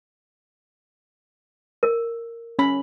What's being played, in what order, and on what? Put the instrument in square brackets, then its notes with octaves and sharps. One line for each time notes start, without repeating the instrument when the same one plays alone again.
[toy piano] A#4
[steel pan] C#4 B5